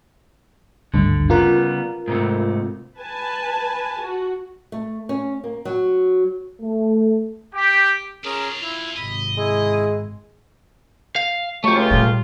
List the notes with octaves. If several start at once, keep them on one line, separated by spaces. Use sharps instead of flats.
G#1 D2 G2 D3
C#3 G3 B3 F4 A#4
G#2 C3 A3
B4 G#5 A5
F#4
A3
C#4
A#3
F#3
A3
G4
C#4 D4 F4 G#4 A#4
F2 E4 F4
G#1 C3 D#5 B5
G#3 E4 G#4
F5
F2 F#3 A3 G4 C#6
C#2 C#3 F4
A#2 G3